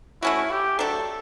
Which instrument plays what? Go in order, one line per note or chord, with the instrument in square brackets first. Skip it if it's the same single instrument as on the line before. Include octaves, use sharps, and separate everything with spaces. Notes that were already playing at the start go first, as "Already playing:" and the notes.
[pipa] A3 C#4 F#4 [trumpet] E4
[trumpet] G4
[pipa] F#3 A3 D4 [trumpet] A4